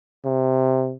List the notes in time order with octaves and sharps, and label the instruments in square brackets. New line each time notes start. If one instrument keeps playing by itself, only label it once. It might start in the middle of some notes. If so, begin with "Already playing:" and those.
[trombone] C3